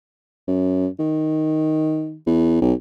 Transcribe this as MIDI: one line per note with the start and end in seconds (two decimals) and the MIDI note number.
0.48 0.87 42
0.99 2.16 51
2.27 2.58 40
2.61 2.73 35